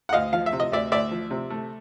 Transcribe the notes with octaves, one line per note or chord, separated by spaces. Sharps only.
F#5
D2 D#5 F5
F3 F5
E5
C3
D#5
D2 D5 E5
D2 D5 E5
F3
C3
A3